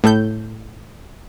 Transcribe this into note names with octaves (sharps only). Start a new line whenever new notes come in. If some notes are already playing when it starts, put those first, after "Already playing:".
A2 A4 G6